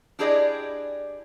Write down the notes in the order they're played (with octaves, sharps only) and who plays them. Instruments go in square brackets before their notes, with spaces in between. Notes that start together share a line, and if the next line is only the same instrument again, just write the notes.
[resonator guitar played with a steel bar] D4 E4 G4 G#4 D5 D#5